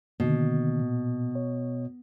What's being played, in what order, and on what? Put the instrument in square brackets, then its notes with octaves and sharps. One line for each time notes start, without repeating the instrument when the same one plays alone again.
[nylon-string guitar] B2 [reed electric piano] D3 D#3 A#3
[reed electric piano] A#2
C#5